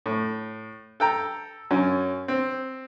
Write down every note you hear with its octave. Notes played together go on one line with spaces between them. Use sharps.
A2
A4 G5 A#5
F#2 C#4
C4